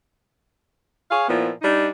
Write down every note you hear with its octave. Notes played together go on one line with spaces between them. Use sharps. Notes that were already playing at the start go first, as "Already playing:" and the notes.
G#4 C#5 F5
A#2 F3 B3 E4
G3 D4 D#4